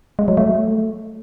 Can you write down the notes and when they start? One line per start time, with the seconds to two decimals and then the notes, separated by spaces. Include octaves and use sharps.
0.19 G#3
0.28 F#3
0.37 A3